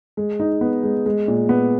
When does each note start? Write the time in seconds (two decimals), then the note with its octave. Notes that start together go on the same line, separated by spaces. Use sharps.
0.17 G#3
0.40 D#4
0.61 B3
0.83 G#3
1.06 G#3
1.28 A#2
1.49 B3